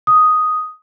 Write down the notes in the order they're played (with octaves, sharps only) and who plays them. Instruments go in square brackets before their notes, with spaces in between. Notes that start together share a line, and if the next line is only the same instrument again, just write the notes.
[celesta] D#6